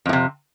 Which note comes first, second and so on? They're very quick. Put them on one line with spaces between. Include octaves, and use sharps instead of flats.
F2 A2 C3